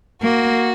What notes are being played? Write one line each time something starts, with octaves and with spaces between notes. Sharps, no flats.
A#3 F#4